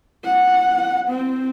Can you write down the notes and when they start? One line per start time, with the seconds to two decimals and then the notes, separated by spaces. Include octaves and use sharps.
0.25 F#5
1.08 C4